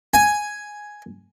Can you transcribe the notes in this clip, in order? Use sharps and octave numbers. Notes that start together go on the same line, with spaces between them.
G#5